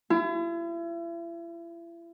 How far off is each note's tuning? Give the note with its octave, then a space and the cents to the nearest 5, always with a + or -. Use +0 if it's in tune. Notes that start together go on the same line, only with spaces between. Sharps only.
E4 +40